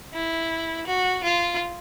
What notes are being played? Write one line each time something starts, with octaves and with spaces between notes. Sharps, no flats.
E4
F#4
F4